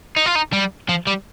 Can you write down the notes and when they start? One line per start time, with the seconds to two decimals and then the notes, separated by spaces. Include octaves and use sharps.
0.16 D#4
0.26 F4
0.35 D#4
0.53 G3
0.89 F3
1.07 G3